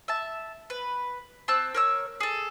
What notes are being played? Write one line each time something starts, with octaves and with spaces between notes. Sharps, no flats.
E5 A5
B4
C4 A5 E6 F#6
A#4 C#5 E6
G#4 A4